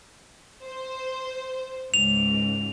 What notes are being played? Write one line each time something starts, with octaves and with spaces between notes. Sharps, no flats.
C5
C#2 G#2 F7